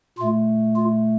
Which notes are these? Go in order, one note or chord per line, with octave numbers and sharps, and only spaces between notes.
A#2 A3 F4
F4